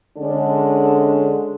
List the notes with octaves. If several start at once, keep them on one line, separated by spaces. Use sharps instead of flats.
D3 G#3 C#4 D4 A4